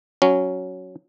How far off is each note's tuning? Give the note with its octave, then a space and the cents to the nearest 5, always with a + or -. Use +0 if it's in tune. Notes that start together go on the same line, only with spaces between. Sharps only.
F#3 +0 C#4 +0